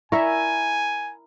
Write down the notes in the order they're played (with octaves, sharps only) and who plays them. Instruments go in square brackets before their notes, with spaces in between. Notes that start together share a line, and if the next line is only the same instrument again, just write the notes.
[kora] E4 A#4 [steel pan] D5 E5 C#6 [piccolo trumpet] G#5